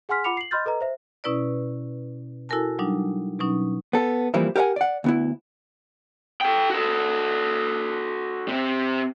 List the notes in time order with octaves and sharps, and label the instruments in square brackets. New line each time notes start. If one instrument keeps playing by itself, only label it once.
[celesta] G#4 F#5 G#5 C6 F6 B6
F4 F#5 B5 D6 C#7 F7
C7 F#7
D#5 B5 C6 F6 G6 A6
A4 B4 D#5 A#5
C5 E5
[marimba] B2 C#4 E4 B4 D5
E4 F#4 A4 A#4 G#5 A5
F#3 G3 D4 D#4
B2 F#3 C#4 D#4
[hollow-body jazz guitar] B3 A4
E3 F3 G3 A#3 C4 E4
G4 A#4 C#5 F#5 G#5
D5 F#5
D2 B3 E4
[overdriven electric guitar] A4 G5
F#4 A4
C3 C4